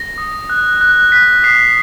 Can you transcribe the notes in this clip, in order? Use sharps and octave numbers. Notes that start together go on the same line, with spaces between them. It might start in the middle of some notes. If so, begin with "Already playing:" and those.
Already playing: A#6
D#6
F#6
F#6
F#6 B6
D#6 C7